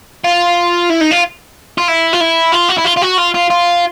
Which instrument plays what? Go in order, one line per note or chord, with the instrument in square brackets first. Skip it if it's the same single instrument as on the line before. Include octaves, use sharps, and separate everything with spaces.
[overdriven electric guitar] F4
E4
D#4
F4
F4
E4
F4
E4
F4
F#4
E4
F4
F4
F#4
F4
F4
F4